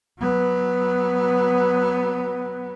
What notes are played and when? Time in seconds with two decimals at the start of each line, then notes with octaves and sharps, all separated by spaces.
0.19 F#3 B3